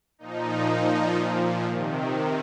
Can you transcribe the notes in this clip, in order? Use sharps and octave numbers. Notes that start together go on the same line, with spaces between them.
A#2 F3 D#4
A#2 F3 D#4
A#2 F3
C3 D#3